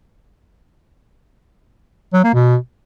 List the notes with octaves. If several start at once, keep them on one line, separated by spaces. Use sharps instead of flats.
F#3
A#3
B2